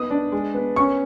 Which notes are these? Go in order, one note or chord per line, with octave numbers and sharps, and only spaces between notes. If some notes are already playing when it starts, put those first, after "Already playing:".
Already playing: B3 D#4 D#6
D4
G#3
B3
C#4 C#6